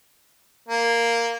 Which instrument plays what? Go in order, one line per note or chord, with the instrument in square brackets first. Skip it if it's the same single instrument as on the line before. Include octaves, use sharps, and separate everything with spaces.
[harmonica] A#3